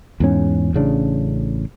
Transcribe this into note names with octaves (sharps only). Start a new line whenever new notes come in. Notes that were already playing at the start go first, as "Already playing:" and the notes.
E2 G#2 C#4
A1 C#3 D4